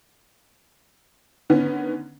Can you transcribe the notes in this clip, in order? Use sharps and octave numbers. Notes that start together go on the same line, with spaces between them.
D3 D#3 B3 C#4